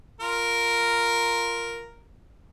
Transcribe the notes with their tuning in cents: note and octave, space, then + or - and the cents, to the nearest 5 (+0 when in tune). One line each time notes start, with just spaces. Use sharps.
F4 +0 A#4 +0